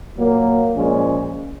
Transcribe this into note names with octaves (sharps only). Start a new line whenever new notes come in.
A#2 F#3 A#3
A#2 F3 G#3 C#4